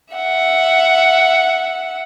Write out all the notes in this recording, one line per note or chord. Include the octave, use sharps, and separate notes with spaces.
E5 F#5